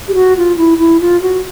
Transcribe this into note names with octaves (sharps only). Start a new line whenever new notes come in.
G4
F#4
F4
E4
E4
F4
F#4